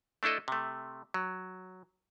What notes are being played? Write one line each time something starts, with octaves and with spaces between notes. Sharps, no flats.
A3 D4 E4 A4 D#5
C3 A3
F#3